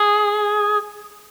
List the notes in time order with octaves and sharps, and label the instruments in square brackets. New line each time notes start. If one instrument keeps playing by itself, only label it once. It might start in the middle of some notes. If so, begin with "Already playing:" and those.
Already playing: [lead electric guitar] G#4